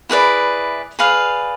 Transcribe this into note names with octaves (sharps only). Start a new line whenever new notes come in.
E4 G#4 B4 D5
G#4 B4 D5 F5